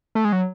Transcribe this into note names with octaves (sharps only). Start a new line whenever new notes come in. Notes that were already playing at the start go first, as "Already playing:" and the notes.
A3
G#3
F#3